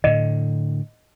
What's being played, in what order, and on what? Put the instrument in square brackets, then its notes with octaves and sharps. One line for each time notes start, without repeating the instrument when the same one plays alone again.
[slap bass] A2 D3 [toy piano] D#5